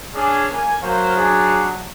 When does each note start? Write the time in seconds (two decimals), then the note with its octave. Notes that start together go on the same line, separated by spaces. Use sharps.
0.14 C#4 D4 G#4
0.52 A#3 G#5
0.83 F#3 A#3 C5 F5
1.16 D4 G#4